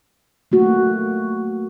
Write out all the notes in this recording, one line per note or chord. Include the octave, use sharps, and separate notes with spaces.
A3 A#3 F#4